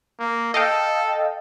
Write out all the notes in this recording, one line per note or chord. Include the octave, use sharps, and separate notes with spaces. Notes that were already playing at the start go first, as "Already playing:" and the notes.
A#3
A4 D#5 F5 G5